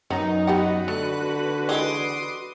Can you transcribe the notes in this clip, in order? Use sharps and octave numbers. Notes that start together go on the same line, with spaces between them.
F#2 D#3 B3 D#4
B3 F#4 G4 B4 F#5
D3 A3 F#6
E3 G#3 D#4 C6 D6 D#6